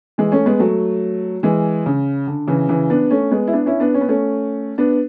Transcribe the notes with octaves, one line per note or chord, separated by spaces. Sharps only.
E3 G#3
A3 C#4
G#3 B3
F#3 A3
E3 G#3
C#3
D3
C#3 E3
C#3 E3
B3 D4
A3 C#4
G#3 B3
E4
B3 D4
C#4 E4
B3 D4
C#4
B3
A3 C#4
B3 D4